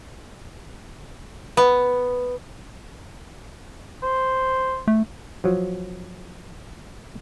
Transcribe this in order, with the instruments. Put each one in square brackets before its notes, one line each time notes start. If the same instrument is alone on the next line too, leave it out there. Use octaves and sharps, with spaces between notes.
[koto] B3
[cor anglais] C5
[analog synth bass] A3
[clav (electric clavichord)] F3 F#3